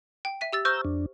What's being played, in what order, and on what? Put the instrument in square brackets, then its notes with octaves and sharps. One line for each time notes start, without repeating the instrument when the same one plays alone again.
[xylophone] G5
E5 B6 D#7
G4 E6 A6
[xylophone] C5 C#6 F6 [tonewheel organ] A#5 E6 G6
[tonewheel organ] F2 D4